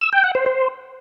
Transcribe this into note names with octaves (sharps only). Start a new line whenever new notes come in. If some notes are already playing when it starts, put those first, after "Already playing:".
E6
G5
F#5
C5
C5